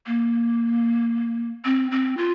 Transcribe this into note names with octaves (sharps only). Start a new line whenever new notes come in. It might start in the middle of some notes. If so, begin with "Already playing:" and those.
A#3
C4
C4
F4